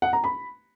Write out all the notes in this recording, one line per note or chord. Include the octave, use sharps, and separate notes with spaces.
F#5
A#5
B5